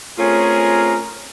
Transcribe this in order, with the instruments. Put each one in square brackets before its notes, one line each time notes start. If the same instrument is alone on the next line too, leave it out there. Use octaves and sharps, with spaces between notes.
[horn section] A3 C4 C#4 F4 G#4 A#4